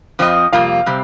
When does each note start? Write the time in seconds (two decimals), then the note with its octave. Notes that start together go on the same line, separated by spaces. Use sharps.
0.19 F2 F3 C4 F4 D#5
0.53 F2 C3 G3 A#3 F4 F5
0.86 C3 G3 C4